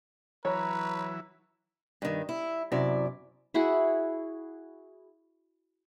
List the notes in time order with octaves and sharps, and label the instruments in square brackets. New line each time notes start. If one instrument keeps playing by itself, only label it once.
[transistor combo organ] E3 F#3 E4 [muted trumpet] B4 [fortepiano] C#5 [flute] A#5
[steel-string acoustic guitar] G2 D#3
E4
F#2 C3 E4 D5
[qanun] E4 F#4 G#4 F#5